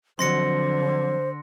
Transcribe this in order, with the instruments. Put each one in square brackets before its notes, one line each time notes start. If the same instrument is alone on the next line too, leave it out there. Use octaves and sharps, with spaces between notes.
[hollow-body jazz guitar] F2 F#3 [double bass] D3 [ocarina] C5 [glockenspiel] C6 A#6 C#7